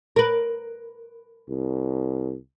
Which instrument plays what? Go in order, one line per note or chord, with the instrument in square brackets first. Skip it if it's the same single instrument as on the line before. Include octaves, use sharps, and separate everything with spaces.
[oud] A#4 B4
[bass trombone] C2